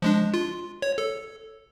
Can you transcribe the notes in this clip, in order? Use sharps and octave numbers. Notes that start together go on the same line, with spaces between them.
F3 G#3 D4
F4
C#5
A4